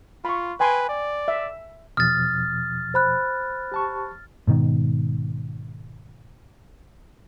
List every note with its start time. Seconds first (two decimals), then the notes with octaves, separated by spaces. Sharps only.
0.25 F4 B5 C#6
0.60 B4 G5 G#5 C6
0.89 D5
1.28 E5
1.97 E2 B2 F3 D#6 F6 A6
2.94 C5 B5 F#6
3.72 G4 A5 C#6
4.47 G#2 B2 D#3